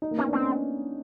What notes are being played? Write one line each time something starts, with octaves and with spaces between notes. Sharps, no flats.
D#4
A#3
B3 C#4
D4
C4 C#4
C#4